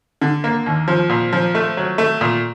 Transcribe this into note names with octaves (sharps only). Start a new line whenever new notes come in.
D3
A#3
D#2
F3
A#2
F3
A3
F#3
A3
A#2